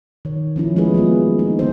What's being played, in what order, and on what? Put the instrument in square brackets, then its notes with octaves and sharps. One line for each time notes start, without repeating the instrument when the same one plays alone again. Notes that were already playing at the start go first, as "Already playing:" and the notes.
[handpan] D#3 C#5
F3 C#4 E4
G#3 A3 B3 E4 G#4 B4
F#3 A#3 B3 F4
D#4
D3 B3 C5